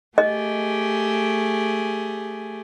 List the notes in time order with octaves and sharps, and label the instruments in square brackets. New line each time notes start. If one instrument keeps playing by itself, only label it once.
[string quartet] A3 G4 G#4 [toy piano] D#5